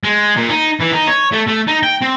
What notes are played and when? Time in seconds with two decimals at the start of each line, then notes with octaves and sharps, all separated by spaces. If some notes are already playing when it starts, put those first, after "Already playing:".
0.04 G#3
0.37 A#2
0.49 D#4
0.81 E3
0.93 D#4
1.08 C#5
1.32 A3
1.47 A3
1.67 D#4
1.83 G5
2.02 C4